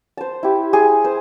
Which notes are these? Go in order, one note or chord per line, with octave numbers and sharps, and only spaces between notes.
C5 A5
E4 G4
G#4
C5